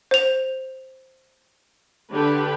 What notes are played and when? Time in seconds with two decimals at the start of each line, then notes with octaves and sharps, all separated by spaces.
0.11 C5 F7
2.12 D3 G4 B4